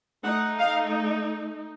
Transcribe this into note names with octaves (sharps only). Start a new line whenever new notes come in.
A3 D#4 F#5
F5